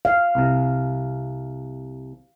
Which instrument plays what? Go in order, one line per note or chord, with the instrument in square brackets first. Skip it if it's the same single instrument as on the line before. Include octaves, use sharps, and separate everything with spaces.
[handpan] F5
[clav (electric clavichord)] C2 C3